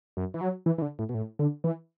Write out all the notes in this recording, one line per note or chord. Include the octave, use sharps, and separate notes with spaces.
F#2
E3
F#3
E3
E3
D3
A2
B2
A2
D3
E3